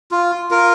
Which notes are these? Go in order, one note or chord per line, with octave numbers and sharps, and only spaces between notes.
F4
F4 A#4